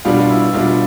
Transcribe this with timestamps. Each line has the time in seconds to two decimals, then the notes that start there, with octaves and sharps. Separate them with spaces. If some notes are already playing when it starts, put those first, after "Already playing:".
0.05 B2 G3 B3 D4 F4
0.20 F4
0.29 E4
0.53 B2 G3 B3 D4 F4